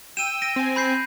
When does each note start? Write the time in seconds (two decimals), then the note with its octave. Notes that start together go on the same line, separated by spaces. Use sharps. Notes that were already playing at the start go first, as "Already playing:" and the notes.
0.17 G5 E6 D#7 E7
0.42 A#6 D7 D#7
0.56 C4 G#5
0.76 B5 G6 C7